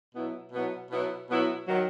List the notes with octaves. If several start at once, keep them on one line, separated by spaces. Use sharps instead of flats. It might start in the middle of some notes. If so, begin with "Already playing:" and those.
B2 F#3 B3 E4
B2 F#3 B3 E4
B2 F#3 B3 E4
B2 F#3 B3 E4
D#3 F#3